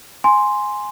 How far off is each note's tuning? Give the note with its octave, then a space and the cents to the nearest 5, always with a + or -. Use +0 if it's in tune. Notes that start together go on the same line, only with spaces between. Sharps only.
G#5 +0 C6 +0